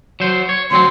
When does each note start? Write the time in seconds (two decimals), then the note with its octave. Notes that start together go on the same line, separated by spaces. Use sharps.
0.20 F#3 C5
0.49 C#5
0.71 D2 F#3 C4 C6